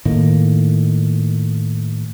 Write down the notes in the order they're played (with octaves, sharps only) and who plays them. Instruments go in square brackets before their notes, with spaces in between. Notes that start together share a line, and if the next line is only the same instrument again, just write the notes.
[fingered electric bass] A2 D#3 A#3